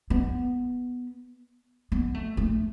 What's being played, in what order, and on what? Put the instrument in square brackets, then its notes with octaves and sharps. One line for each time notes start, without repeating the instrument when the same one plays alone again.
[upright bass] B3
B3
A3
A3